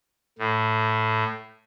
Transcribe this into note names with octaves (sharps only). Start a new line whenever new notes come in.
A2